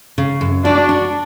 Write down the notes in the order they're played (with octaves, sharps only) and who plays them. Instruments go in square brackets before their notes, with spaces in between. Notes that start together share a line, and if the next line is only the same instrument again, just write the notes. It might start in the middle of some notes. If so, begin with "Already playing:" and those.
[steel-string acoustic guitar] C#3
F#2
[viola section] D4 [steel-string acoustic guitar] F#4
[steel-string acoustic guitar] D4